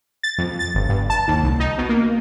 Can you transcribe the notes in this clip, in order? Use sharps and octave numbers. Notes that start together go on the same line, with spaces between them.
A6
F2
A6
G1
G2
A5
D#2
C2
D#4
B2
A#3